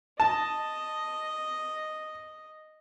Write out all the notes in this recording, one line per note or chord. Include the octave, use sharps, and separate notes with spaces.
D#5 A5